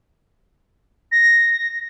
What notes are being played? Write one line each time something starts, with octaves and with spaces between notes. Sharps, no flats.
A#6